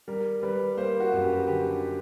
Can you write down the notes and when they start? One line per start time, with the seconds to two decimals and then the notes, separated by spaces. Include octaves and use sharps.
0.08 G3 A#4
0.43 G3 B4
0.77 A#3 C5
1.00 F#4
1.13 F#2
1.24 G4
1.47 D3 G4